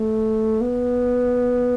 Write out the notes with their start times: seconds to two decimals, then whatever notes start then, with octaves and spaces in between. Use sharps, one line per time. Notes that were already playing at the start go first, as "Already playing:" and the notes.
Already playing: A3
0.61 B3